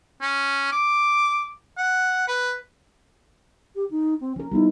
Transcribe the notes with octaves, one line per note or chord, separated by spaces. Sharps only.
C#4
D6
F#5
B4
G4
D#4
C4
F3 C#4 A#4
G3 B3 D#4 E4